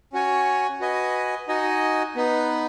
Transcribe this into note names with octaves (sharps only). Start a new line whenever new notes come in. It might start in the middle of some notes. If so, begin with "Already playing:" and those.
C#4 F#4 C#5 G#5
F#4 B4 D#5 G#5
D#4 F#4 D#5 G#5
B3 D#4 B4